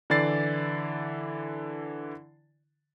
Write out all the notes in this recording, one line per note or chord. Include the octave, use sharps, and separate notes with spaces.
D3 E3 E4 D5 A6 C7